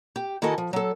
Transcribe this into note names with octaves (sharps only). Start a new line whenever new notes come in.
G4
D#3 E4 F#4 A4 D#5 G#5
F3
F#3 A4